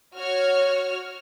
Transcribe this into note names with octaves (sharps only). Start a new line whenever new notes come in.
F#4 C#5 F6